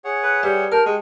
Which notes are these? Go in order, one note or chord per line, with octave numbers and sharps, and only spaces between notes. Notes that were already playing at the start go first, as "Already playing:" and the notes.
G#4 C#5 F#5
B4
G3 G4 B4 E5
A#4 A5 G6
G#3 G5 C#6